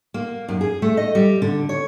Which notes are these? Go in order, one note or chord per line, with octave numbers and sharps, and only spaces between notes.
A#3
F#2
G#4
A3
D#5
G3
D3
C#5